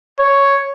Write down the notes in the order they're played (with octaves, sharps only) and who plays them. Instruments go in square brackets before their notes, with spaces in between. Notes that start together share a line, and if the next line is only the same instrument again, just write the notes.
[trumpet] C#5